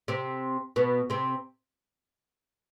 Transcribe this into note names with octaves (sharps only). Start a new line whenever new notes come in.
C3 C4
B2 B3
C3 C4